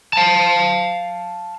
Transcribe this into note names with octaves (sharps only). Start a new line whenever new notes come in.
F5 A5